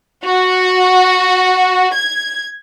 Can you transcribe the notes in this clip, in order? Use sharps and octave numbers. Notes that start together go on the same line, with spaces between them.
F#4
G#6